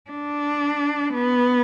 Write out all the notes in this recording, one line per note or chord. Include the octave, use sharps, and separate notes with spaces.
D4
B3